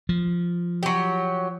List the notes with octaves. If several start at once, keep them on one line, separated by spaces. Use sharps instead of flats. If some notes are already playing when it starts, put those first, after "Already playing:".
F3
F#3 G4